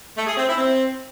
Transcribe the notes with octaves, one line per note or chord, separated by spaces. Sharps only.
A3
G#4
C4
E4
C4